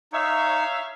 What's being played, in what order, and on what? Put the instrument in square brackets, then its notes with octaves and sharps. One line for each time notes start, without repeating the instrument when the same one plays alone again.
[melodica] D#4 [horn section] C#5 E5 F5